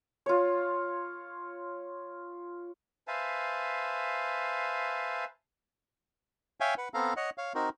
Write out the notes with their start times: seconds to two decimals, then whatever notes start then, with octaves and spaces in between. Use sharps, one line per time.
0.26 F4 C#5
3.08 B4 C5 E5 F5 G#5 A5
6.60 C#5 E5 F5 G5 G#5
6.78 B4 F#5
6.94 B3 C4 A4 F5 A#5
7.17 C#5 D#5 F#5
7.38 C#5 F5
7.55 C4 D#4 F#4 A#4